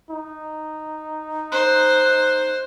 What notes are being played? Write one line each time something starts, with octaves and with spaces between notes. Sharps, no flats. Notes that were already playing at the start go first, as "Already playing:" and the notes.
D#4
C5 F#6